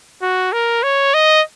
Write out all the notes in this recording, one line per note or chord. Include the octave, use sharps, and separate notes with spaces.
F#4
A#4
C#5
D#5